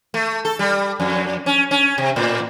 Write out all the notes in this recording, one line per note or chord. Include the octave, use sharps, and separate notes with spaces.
A3
A4
G3
F2
C#4
C#4
C3
A2